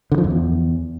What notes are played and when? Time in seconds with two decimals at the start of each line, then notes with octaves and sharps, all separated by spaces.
0.12 D3
0.18 F3
0.24 F2
0.30 E2